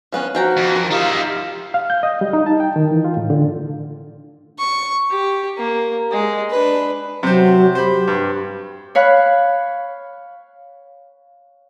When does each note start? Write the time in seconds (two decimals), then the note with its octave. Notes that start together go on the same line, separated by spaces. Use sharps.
0.12 F3 B3 C#4
0.35 F3 F#4 G5 A#5
0.57 F2
0.76 A#4
0.91 D#4 F4 G4 E5 F5
1.74 F5
1.90 G6
2.03 D#5
2.21 G3
2.33 D#4
2.46 A5
2.60 G5
2.76 D#3
2.91 E3
3.04 F4
3.17 A2
3.30 D3
4.59 C#6
5.10 G4
5.58 A#3
6.11 G#3
6.50 D4 B4
7.23 C3 F#3 C5
7.75 G4 C5 B5
8.07 G2
8.95 C#5 F5 B5 F#6